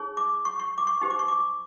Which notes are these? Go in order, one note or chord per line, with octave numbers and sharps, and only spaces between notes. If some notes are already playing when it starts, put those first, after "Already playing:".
Already playing: D#4 G#4 C#5
D6
C#6
C#6
D6
C#6
D#4 G4 C5
D6
C#6
D6